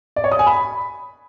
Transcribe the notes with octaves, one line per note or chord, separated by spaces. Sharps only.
D5
C#5
D#6
G#5
B5